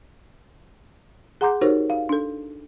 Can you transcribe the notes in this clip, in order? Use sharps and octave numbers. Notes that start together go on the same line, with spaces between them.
G#4 F#5 A#5 C6 D6 G6
D#4 F#4 G4 A#4 C5 C#5
F5
D4 A4